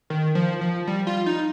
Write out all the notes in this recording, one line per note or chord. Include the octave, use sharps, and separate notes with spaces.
D#3
F3
F3
G3
F4
D#4